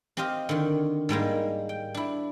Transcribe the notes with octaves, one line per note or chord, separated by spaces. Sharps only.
C4 G4 C5 D#5 F5
D3 D#3
G#2 G3 G#3 A#3
G5
D4 E4